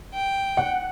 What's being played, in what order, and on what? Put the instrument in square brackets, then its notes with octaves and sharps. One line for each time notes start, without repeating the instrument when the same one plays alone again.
[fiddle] G5
[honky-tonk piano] F#5